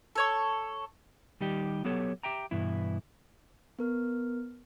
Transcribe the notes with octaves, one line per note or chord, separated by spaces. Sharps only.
A4 C#5 C#6
D#3 G3 D#4 G4
F#3 B3 G4 A4 C#5
G4 E5 G5 A#5
G2 B2 E3 E4
B3 A#4 F6